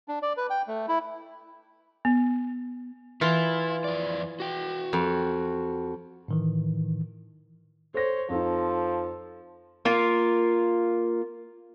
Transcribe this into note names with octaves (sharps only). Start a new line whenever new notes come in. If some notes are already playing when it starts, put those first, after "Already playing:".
D4
D5
B4
G5
A3
E4
B3
E3 E4 F4
F2 D5
F#4 G5
F2
A2 D#3 E3
A4 C5 C#5 A#6
F2 F3 D#4 A4
A#3 F4 A#4